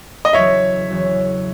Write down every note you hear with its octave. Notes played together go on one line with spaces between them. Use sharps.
D#5
E2 C#3 F#3 C#5 E5
E2 C#3 F#3